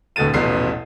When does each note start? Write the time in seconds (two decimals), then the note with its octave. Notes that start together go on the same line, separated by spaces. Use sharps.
0.16 D1 D2 B2 D3 A6 D#7
0.34 D#1 A1 B2 B3 C7